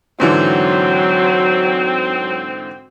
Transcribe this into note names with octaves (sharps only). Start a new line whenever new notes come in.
G#2 D3 E3 F#3 C4